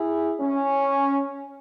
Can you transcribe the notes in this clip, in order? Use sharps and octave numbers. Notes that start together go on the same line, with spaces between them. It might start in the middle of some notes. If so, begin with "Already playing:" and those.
Already playing: E4 G#4
C#4